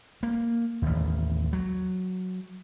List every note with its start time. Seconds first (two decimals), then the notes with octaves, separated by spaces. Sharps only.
0.23 A#3
0.82 A1 D#2
1.53 F#3